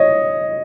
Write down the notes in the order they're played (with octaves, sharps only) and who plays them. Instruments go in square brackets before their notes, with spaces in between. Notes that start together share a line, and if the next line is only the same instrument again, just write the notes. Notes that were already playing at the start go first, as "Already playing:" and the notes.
Already playing: [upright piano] C#5 D#5